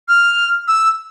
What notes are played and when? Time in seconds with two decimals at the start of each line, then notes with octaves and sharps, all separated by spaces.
0.08 F6
0.68 E6